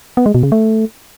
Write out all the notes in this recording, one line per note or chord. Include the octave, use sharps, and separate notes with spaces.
B3
G#3
B2
C#3
A3